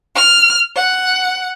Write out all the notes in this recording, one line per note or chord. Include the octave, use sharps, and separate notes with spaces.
F6
F#5